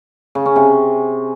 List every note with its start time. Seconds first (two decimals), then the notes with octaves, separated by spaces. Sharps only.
0.35 C#3
0.45 C#4
0.56 C3